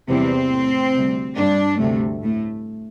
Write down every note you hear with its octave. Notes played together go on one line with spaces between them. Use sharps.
E2 C3 E3 G3 C4
A2 A3
D2 C3 G3
G2 G3 D4
D2 C3 A3
A2 A3